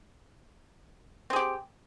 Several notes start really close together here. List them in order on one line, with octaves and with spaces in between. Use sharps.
C4 G#4 G4